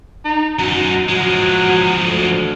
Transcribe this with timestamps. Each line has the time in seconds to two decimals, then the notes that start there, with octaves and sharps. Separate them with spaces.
0.25 D#4
0.59 F#2 F#3 D#4
1.09 F3 F#3 G#3
2.03 D2